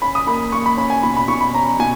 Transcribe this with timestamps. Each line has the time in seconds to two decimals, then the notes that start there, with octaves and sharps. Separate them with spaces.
0.02 C#4 B5
0.15 D#6
0.27 A#3 B5
0.52 A#3 C#6
0.66 B5
0.77 C#4 B5
0.90 G#5
1.03 B2 B5
1.16 B5
1.28 B2 C#6
1.41 B5
1.54 C#4 A#5
1.79 B2 G#5